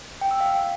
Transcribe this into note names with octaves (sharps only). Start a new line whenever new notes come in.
G5
E6
F5